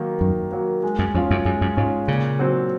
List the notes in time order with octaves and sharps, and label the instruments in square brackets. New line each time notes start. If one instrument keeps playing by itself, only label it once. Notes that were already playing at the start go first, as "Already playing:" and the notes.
Already playing: [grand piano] D#3 F#3 A#3
[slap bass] F#2 [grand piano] D#3
[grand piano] F#3 A#3
G#3
[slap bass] F#2
[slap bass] F2 [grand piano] C#4 F4 G#4
[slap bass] F#2
[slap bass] F#2 [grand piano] G#3
[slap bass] F#2
[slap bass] G#2 [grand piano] C#4 F4 G#4
[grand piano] A#2 [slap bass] C#3
[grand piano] F#3 C4